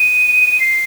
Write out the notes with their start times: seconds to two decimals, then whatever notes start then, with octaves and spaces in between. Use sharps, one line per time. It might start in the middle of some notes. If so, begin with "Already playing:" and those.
Already playing: D#7
0.60 C7